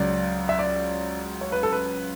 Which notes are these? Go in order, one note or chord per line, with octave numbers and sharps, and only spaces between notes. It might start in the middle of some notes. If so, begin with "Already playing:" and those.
Already playing: C#2 C#3 F#3 D5
E5
D5
C#5
B4
A4
B4